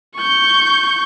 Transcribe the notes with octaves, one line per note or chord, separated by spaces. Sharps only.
C#6 G6